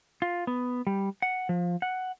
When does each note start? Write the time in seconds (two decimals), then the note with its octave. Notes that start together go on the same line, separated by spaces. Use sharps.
0.22 F4
0.47 B3
0.87 G3
1.22 F#5
1.49 F3
1.82 F#5